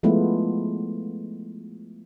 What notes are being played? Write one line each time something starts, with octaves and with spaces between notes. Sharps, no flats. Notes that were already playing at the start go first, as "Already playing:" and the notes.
F3 G#3 A3 B3 E4 F4